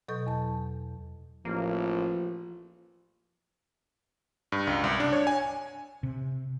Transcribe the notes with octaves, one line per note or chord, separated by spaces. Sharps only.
B2 F#3 A4 D#5 C#6 G6
E2 A5
A1 F3 A#3
G2
C#2
C2
D4
C#5
G#5
C3